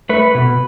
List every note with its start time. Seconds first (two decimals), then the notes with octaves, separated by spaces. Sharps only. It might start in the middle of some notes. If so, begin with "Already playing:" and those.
0.09 A3 B4
0.35 B2